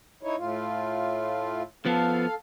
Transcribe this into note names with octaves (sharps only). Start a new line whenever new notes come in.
D#4 E4 C#5
A2 F4
F3 B3 A4 F5